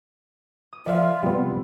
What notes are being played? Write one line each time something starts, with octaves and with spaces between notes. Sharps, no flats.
D#6
F3 F4 D5 E5 F5
C3 G3 B3